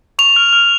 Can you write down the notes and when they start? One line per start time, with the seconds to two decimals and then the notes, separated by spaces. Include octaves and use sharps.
0.19 C#6 F7
0.36 F6
0.53 F6